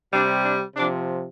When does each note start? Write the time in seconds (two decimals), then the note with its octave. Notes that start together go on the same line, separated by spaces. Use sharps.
0.12 C3 G3 D4
0.44 D4
0.76 C3 F3 D4